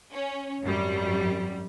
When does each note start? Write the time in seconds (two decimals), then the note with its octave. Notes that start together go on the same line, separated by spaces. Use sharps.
0.12 C#4
0.64 G#1 F#2 G3